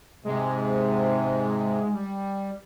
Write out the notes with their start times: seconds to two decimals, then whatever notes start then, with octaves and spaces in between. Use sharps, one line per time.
0.24 G#2 C3 G#3
1.92 G3